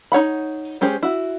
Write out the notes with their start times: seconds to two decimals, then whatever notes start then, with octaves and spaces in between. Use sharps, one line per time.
0.12 D#4 C#5 F#5 B5
0.81 G#3 C#4 G4 G#4 C5
1.03 E4 F#4